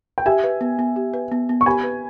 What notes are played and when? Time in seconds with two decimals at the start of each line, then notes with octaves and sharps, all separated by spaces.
0.18 G5
0.26 G4 E5 G#5
0.44 B4
0.61 B3
0.79 B3
0.96 G4
1.14 B4
1.32 B3
1.49 B3
1.61 C#6
1.66 G4 G#5 B5
1.83 B4